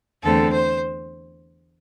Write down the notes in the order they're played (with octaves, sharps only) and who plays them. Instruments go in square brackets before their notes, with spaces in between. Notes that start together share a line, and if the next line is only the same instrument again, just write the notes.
[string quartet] E2 D3 A3 C4 A4
C5